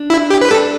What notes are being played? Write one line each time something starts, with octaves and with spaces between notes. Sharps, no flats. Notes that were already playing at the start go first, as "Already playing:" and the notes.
Already playing: D4
E4
G4
B4
D4 A4